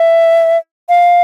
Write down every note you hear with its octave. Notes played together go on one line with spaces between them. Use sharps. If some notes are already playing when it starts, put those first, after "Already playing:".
Already playing: E5
F5